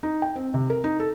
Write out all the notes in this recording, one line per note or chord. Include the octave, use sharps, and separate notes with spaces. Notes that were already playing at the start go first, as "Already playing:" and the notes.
D#4
G5
C4
C3
A#4
D#4
A4